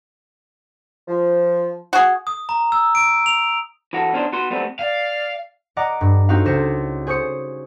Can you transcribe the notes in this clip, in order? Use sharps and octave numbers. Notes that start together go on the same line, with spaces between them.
F3
F#4 G#4
D#6
A#5
E6
D7
F7
E3 F#4 A4
B2 C#4 D4 C5
B3 F#4 C6
F#3 G3 A3 B3 C4
D5 F5
D5 D#5 F#5 A#5 D6
G2
A3 C4 D#4 F#4 F5
C#2 C5 A#6 C#7 E7
G#4 C5 C#6 D#6 C#7